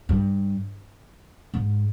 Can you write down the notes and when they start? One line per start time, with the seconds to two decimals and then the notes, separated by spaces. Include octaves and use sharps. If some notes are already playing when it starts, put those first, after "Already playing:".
0.09 G2
1.54 G#2